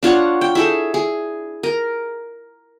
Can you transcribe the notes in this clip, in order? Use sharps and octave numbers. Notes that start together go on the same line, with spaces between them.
D4 F4 C#5 F#5
G5
E4 G#4 A4
G#4
A#4